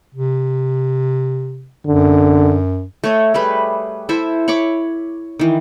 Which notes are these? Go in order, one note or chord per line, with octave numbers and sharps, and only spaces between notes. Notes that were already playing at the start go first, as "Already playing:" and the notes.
C3
F#2 D3
A3 C#5 D#5
G3 A3 G#4 B4
E4 A4 C5 E5
C#5 B5 C#6 D6
D#3 E3